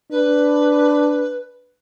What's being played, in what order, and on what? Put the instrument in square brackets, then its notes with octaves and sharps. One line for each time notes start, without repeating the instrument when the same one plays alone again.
[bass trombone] D4 [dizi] B4